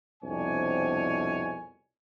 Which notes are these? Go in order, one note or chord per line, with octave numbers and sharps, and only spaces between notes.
C2 F2 B2 D4 C#5 G#5